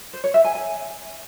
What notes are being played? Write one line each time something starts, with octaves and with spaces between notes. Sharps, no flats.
C5
C#5
E5
G#5
G#5